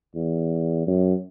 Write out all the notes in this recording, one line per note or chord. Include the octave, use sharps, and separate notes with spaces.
E2
F#2